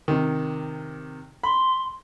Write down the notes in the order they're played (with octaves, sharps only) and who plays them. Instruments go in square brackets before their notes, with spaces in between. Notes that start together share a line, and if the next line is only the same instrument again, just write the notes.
[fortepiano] C3 D#3
[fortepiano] B5 [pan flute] C6